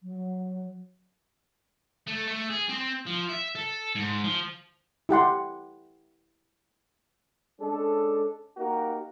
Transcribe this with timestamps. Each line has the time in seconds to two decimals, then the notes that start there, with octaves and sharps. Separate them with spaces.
0.03 F#3
2.07 A3
2.28 A3
2.50 G#4
2.69 C4
3.07 F3
3.29 E5
3.55 A4
3.95 G#2
4.24 F3
5.09 E4 G4 F#5 C6
7.60 G#3 C#4 D4 A4
8.57 A#3 D#4 F#4 G4 A#4